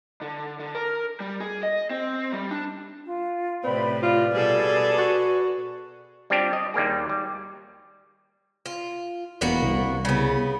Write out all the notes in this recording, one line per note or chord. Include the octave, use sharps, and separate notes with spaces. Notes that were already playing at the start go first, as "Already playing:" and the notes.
D3
D3
A#4
G3
G#4
D#5
C4
G3
D4
F4
A2 C3 C4 B4 D5 B5
F4 B4 D5
B2 G3 G#4 A4
F#4
G3 C4 D4 F4 G4
D#5
D#2 G3 A#3 G#4
G3
F4
E1 A#3 B3 F#4
C2
C#3 B3